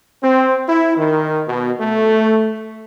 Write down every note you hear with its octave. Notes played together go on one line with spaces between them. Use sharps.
C4
E4
D#3
B2
A3